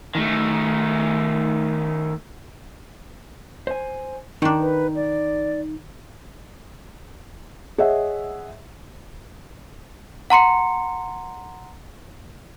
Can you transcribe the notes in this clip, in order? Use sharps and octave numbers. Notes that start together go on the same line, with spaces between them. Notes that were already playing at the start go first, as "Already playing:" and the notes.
D#3 A3
C5 G#5
D#3 D4 D#4
B4
D5
G#4 C#5 D#5 E5 F#5
F#5 A#5 C6 C#7